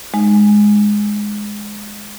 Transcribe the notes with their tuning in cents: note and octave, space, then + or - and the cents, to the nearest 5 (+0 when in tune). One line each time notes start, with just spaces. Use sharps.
G#3 +0 D#4 -10